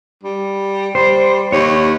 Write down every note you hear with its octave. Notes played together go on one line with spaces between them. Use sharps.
G3
G3 C5
D#2 C#5